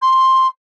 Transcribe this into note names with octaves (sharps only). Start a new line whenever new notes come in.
C6